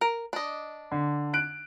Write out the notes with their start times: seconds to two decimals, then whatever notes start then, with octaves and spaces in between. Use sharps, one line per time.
0.01 A#4
0.33 D4 D#5
0.91 D3
1.33 F#6 D7